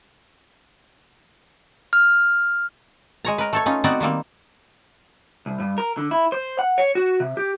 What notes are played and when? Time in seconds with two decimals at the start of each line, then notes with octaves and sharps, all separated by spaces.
1.93 F6
3.25 G#3 C#5 A#5
3.38 A#4 B4
3.53 A3 A4 C#5
3.66 C#4 D#4 F4
3.84 B3 C4 D#4 F#4 D5 F#5
4.00 D#3 G3 A#3 C4
5.46 C2
5.60 G2
5.78 A#4
5.97 D3
6.11 E4
6.32 C5
6.59 F#5
6.78 C#5
6.95 F#4
7.20 C3
7.37 G4